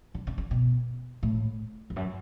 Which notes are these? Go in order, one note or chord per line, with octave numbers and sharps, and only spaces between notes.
D3
C#3
C#3
B2
A2
E2
F#2